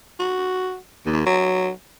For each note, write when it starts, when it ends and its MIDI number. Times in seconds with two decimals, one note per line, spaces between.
0.20 0.77 66
1.06 1.26 39
1.26 1.70 54